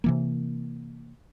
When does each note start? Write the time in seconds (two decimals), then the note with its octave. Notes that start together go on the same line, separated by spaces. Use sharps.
0.04 C3 E3 A#3